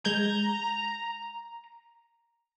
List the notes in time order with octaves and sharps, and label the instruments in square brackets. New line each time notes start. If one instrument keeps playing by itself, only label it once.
[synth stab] G#3 G6 G#6 [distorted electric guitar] A#5